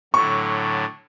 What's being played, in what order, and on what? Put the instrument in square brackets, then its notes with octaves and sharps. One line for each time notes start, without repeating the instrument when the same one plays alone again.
[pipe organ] A2 D3 F#3 [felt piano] C#6